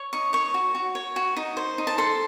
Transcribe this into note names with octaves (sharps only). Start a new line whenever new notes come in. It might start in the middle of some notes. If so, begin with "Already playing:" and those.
Already playing: C#5
D#4 C#6
C#5 C#6
F#4
F#4
C#5
F#4
D#4
C5
D#4
A5
A4 C6